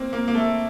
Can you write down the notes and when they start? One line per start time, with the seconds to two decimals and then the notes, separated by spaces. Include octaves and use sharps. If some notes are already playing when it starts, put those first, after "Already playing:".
Already playing: A#3 C4
0.13 A#3
0.28 A#3
0.35 A3